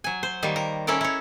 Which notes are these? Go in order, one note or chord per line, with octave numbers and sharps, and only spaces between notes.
F#3 G#5
C5
D#3 G3 A#3
A#4
C#4 E4 A4 A#4 D5
E4 C#5